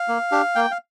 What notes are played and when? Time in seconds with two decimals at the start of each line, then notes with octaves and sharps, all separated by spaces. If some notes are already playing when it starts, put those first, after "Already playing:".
Already playing: F5
0.08 A#3
0.32 D4 G4
0.55 A#3 G5
0.71 F5